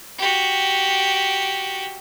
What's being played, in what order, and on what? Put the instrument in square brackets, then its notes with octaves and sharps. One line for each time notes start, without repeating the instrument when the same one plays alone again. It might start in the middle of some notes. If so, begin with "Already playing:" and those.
[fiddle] F#4 G4